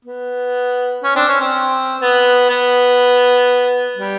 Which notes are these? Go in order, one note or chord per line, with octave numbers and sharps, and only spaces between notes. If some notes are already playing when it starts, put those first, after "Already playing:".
B3
C#4
C4 D4
C#4
C4
B3
B3
G3